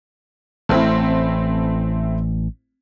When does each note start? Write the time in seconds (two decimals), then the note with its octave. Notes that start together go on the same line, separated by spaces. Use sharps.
0.69 A1 A3 C4 E4